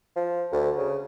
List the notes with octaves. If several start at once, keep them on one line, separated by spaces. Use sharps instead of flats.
F3
D2
C#3